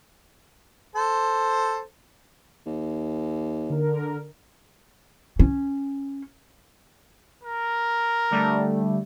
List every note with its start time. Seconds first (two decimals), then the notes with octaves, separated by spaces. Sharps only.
0.95 A4 C5
2.66 D#2
3.70 D3 A#4
5.39 C#4
7.43 A#4
8.31 D3 G3 A3